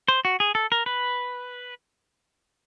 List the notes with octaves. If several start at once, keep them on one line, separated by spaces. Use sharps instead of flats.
C5
F#4
G#4
A4
A#4
B4